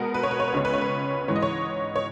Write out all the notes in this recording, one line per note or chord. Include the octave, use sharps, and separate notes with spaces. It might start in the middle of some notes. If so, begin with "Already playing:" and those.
Already playing: B2 G#3 B3 A#4
B4
C#5
B4
C#5
B4
C#2 C#3 G#3 C#5
B4
C#5
B4
G#2 E3 G#3 C#5
D#5
C#5
C#5